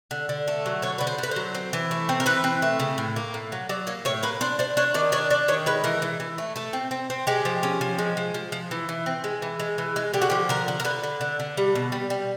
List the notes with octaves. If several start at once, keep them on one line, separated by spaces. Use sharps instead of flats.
D3
D3
A3
F#3
D3 C#5
D3 B4
C5
D3 B4
F#3 C5
C4
E3
A3
C4
A#4
E3 B4
C4
A3
C#3
A2
A#3
A2
F#3
F#3 D5
A#3 C#5
A2 C#5
A#3 B4
D4 C5
D4 C5
D4 C#5
D#3 D5
D4 C#5
D4 D5
D#3 C#5
G#3 B4
E3 A#4
E3
E3
A3
A3 A4
C4
C4
C4
G#3 G4
F3
C#4
F3
G#3
F3
F3
F3
E3
E3
C4
G#3
E3
G#3
E3
G#3
D3 G4
F#4
F3 G4
D3 A#4
D3
A#4
D3 B4
D3
D3
D3
G3
B2
G3
G3